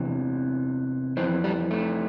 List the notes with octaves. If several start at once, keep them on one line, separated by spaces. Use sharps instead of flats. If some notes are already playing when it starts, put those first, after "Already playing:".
Already playing: E2 C3 E3
F2 E3 C4
G3
A3